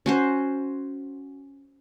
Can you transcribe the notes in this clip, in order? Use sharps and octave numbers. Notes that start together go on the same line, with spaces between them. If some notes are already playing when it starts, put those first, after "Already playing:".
C#4 F#4 C5